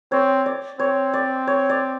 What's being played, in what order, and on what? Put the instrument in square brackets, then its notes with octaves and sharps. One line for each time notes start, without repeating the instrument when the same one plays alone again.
[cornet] C4 [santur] C#5
[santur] D5
[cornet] C4 [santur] C#5
[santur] D5
C#5
D5